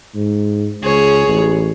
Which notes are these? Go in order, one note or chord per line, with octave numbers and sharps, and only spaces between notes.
G#2
C#2 G#4 C#5
A1